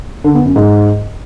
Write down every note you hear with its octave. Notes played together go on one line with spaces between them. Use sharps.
D3
B3
F#2
G#2